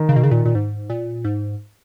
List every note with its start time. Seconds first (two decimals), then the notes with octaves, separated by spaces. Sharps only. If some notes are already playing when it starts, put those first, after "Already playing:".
Already playing: D#3
0.09 C#3
0.16 B2
0.23 C#3
0.31 A#2
0.46 A#2
0.55 G#2
0.90 A#2
1.24 G#2